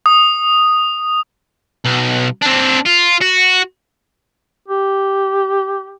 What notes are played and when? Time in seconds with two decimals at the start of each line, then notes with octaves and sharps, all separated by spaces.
0.06 D#6
1.85 B1
2.42 C4 D4
2.86 F4
3.21 F#4
4.68 G4